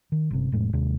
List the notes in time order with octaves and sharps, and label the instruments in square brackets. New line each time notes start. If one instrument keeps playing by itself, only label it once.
[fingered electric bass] D#3
G1 C3
F1 A2 G#3
D#2 C3 G#3